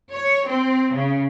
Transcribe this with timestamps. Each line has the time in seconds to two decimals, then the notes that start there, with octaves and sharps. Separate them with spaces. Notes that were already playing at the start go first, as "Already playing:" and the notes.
0.12 C#5
0.47 C4
0.94 C#3